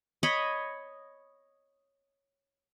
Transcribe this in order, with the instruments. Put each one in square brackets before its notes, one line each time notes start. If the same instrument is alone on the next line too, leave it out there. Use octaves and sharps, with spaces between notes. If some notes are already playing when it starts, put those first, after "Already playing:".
[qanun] C#5 D#5 B5